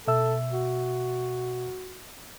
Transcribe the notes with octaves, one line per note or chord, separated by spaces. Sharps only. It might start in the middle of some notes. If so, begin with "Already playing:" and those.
B2 A4 E5 E6
F#4